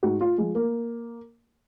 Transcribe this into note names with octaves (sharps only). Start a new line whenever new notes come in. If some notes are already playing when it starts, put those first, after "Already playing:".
G#2 F#4
F4
F3 G#3
A#3